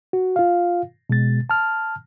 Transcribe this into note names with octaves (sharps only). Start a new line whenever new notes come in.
F#4
F4 F5
B2 G#3 A6
A5 F6